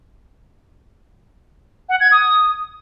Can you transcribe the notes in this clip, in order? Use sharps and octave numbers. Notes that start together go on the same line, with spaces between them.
F#5
G#6
D#6